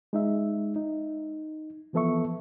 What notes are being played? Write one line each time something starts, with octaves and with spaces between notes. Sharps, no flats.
G#3 D#4 E5
D#4
E3 F3 B3 A4 E5 C#6